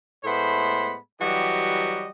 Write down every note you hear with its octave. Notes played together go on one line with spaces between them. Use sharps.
A2 G#3 A3 B3 C5 B5
E3 F#3 G3 F#4 G4 D#5